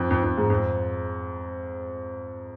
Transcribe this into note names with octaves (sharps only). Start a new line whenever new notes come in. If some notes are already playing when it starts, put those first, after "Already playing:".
Already playing: F2
F2
F2
G#2
F2